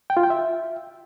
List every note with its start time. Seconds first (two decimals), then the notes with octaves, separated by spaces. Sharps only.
0.10 G5
0.17 F4
0.23 G5
0.30 E5